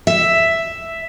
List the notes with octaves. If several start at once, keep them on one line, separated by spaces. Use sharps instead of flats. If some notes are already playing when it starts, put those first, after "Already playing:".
E5